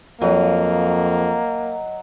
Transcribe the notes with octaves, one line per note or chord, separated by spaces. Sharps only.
F2 F#3 A#3 D#5